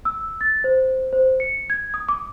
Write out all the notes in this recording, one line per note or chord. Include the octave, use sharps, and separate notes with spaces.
E6
A6
C5
C5
C#7
G#6
D#6
D6